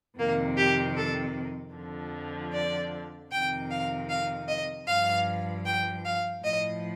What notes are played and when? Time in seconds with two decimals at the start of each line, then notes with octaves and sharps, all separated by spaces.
0.18 F2 C3 D#3 A#3
0.57 G4
0.96 A4
1.74 F2 D3 F3
2.52 D5
3.31 F2 C3 D#3 G5
3.70 F5
4.09 F5
4.48 D#5
4.87 G2 F3 F5
5.65 G5
6.05 F5
6.43 A2 F3 D#5